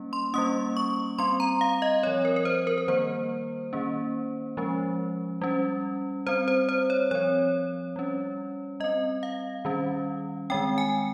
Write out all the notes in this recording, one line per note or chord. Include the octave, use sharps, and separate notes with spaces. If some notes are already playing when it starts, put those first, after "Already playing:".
Already playing: G3 A#3 C#4
C6
G3 A#3 C#4 D#6
C#6
G3 C4 C6
A#5
F5
D#5
F3 C4 C#5
A#4
A#4
C5
A#4
A#4
D#3 G3 A#3 C5
D#3 A#3 C#4
F3 G#3 C#4
G3 C#4
G3 C4 C5
C5
C5
C#5
F3 C4 C#5
G3 C#4
G3 C4 D#5
F5
D#3 G3 C#4
D#3 G#3 C4 G5
G#5